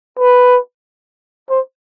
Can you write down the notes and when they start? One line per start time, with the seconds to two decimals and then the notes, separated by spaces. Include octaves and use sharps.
0.19 B4
1.50 C5